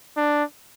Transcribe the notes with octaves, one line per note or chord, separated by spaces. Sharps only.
D4